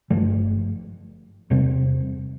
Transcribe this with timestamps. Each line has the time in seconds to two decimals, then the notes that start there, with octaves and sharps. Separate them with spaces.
0.10 G1 G2 F3 A3
1.50 E2 C3 G3 C4